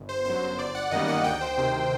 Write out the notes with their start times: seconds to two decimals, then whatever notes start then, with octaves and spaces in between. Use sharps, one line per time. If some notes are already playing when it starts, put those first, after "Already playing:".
Already playing: G1
0.09 C5
0.25 F#2 F#3 C5
0.42 C5
0.58 G1 D5
0.75 F#5
0.91 F#2 D#3 G3 A#3 D#5
1.08 F#5
1.24 D2 G5
1.41 C5
1.58 C3 D#3 C5